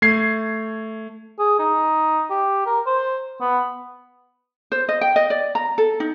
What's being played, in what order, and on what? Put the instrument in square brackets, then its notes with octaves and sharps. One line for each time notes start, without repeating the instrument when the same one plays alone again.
[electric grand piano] A3 G#6 C7
[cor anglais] G#4
D#4
G4
A#4
C5
B3
[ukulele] C5
D#5
G5
D#5
D5
A#5
A4
D#4